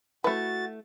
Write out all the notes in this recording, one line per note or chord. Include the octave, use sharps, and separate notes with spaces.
A3 E4 F#4 B4 A6